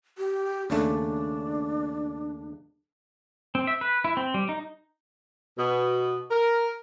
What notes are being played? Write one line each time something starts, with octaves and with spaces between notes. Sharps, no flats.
G4
D#2 C#3 A3 D4
C4
E5
B4
E4
C4
G3
D#4
B2
A#4